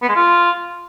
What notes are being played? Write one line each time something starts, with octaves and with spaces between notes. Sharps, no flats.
B3
G#3
F4